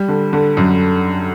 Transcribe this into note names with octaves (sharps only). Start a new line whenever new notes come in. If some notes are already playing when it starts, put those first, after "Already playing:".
Already playing: G3
D3
D3
F#2